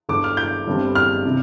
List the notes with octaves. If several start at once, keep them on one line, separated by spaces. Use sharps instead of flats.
G1 G2 D3 D6
F6
G6
G1 G2 D3 G3 C4
F6
C3